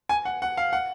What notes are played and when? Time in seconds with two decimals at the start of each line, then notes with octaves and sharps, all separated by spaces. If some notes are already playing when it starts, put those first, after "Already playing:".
0.09 G#5
0.25 F#5
0.42 F#5
0.57 F5
0.73 F#5